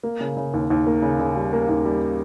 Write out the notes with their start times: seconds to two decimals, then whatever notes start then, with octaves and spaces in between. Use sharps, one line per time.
0.03 A#3
0.21 C#3
0.37 C#3
0.54 D#2
0.70 D#2
0.87 A#3
1.02 C#3
1.19 C#3
1.36 G3
1.53 A#3
1.69 D#2
1.85 G3